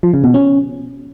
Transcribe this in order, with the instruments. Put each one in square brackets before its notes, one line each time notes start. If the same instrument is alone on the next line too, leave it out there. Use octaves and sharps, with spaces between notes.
[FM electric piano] F3
C#3
B2
C#4